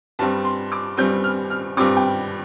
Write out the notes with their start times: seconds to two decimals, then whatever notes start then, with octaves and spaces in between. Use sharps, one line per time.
0.19 G2 G3 C4 A5
0.44 C6
0.72 D6
0.97 G2 G3 C4 G6
1.24 F6
1.50 F6
1.77 G2 G3 C4 D6
1.97 G5